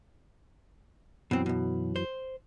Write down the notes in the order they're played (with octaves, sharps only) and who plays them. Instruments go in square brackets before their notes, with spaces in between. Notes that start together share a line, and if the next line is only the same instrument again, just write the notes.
[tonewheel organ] F#2 E3 F#3 [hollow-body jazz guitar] B2 C4
[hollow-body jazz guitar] B1 B2
C5